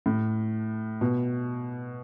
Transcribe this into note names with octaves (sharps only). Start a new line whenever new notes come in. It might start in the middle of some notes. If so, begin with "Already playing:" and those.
A2
B2